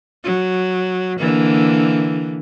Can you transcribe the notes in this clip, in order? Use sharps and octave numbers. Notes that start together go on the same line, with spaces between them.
F#3
D3 E3 A#3